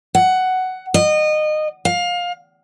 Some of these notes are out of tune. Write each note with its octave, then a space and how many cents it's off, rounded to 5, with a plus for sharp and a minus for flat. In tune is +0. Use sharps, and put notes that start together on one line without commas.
F#5 +10
D#5 -25
F5 +20